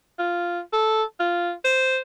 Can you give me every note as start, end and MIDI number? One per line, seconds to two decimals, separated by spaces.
0.19 0.60 65
0.73 1.03 69
1.20 1.52 65
1.64 1.99 72